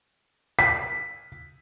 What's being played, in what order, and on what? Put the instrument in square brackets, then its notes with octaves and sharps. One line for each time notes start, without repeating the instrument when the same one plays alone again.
[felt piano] B6